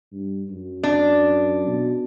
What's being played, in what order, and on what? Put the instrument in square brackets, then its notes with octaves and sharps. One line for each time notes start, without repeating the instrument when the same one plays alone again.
[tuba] G2
F#2
[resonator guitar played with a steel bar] D4
[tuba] B2